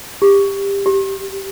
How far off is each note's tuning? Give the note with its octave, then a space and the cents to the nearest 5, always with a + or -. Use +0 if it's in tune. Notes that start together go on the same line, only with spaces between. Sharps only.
G4 +20
G4 -15